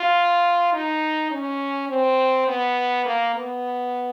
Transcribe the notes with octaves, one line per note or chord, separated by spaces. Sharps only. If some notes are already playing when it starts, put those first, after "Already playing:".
Already playing: F4
D#4
C#4
C4
B3
A#3
B3